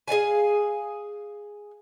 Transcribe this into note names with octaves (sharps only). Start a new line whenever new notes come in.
G#4 D5 F5 G#5